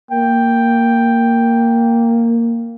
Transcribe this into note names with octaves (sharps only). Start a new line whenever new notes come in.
A#3 G5